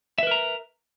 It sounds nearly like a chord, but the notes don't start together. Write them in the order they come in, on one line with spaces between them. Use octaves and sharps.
E5 B4 A#4 A#5